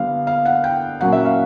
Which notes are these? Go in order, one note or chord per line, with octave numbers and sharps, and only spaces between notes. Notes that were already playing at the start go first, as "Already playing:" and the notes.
Already playing: D3 G3 B3 F5
F5
F#5
G5
A#2 F#3 A#3 C#4 F#5
E5
F5